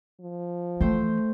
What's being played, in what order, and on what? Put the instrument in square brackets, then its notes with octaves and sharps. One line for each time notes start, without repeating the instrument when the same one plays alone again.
[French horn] F3
[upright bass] E3 [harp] A3 C5 G5